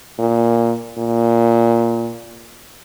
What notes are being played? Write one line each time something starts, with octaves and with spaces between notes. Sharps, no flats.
A#2
A#2